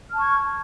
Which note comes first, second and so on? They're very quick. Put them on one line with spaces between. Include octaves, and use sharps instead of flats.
F6 A5 C#6 G#6